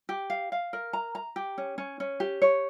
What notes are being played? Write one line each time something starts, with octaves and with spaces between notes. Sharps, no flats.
G4
F5
F5
A#4
A#5
A#5
G4
C#4
C#4
C#4
G4
C#5